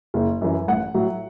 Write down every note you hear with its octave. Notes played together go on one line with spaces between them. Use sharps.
F#1
F#2 E3
A1 F#5
A2 F#3